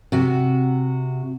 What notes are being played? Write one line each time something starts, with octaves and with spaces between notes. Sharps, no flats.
C3 F#4